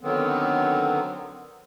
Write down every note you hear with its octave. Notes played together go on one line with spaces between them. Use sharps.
D3 D#3 F#3 B3 C4